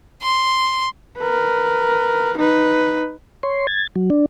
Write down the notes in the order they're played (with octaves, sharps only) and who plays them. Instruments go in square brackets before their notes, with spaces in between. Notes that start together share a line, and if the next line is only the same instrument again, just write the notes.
[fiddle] C6
[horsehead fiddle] A#4 B4
D#4 B4
[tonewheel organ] C#5 C6
G#6 A6
F#3
D4